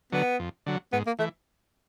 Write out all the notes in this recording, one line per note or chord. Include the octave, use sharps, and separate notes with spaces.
D3 F#3 B3
F2
D3 F#3
G#2 B3
A#3
E3 A3